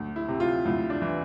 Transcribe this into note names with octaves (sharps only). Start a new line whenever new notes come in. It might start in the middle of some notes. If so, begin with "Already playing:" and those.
Already playing: D2
E4
C3
F4
D2 E4
D4
E3